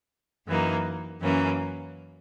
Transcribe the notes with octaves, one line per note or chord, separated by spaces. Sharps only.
F#2 E3 A#3 D#4
F#2 E3 A#3 C#4